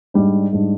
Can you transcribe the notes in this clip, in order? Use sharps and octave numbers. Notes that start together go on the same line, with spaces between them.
G#2 G3 D4
G#2 G3 D4